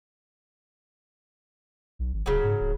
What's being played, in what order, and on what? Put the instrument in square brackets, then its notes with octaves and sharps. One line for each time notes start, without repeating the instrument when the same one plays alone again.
[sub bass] B1
G#1
[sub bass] D1 [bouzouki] C#3 F#3
[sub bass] G#2
D1